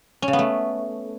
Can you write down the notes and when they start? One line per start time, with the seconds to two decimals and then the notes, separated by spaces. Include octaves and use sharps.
0.22 C#4
0.28 C#3
0.33 B3
0.39 A3